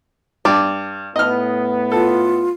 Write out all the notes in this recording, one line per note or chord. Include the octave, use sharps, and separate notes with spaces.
G2 D5
A2 B3 D#5 F6
F4 A4